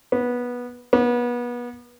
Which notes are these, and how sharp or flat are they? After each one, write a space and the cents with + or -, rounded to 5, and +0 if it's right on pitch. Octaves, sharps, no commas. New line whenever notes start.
B3 -15
B3 -30